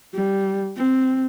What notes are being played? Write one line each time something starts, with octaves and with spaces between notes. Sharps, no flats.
G3
C4